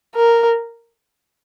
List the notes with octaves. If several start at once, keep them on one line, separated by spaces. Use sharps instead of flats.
A#4